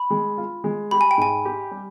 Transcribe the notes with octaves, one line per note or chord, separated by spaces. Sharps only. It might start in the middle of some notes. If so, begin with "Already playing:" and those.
Already playing: B5
G#3
F4
G#3
G4 B5
G#5
G5
G#2 G#5
G4
G3